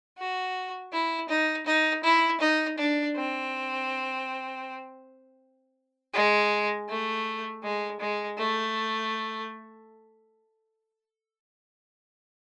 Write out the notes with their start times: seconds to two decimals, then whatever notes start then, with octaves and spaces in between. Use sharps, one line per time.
0.18 F#4
0.93 E4
1.29 D#4
1.66 D#4
2.04 E4
2.41 D#4
2.78 D4
3.16 C4
6.14 G#3
6.89 A3
7.63 G#3
8.00 G#3
8.38 A3